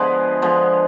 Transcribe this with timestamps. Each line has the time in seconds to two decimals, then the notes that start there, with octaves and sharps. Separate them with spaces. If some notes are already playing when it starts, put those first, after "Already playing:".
Already playing: D3 F3 G#3 B3 G#4 B4
0.42 D3 F3 G#3 B3